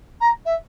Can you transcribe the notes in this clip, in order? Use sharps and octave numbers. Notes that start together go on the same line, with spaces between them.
A#5
E5